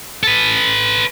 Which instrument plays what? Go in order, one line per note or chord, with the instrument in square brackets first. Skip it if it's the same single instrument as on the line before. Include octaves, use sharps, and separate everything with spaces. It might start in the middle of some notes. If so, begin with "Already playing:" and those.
[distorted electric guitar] A4 B4